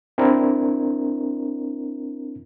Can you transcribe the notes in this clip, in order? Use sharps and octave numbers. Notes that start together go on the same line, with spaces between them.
C4 D4 E4 A#4